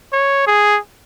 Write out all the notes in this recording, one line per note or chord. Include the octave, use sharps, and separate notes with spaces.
C#5
G#4